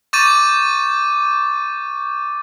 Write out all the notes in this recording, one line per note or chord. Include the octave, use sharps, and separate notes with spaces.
C#6 D6 G6 A6 D#7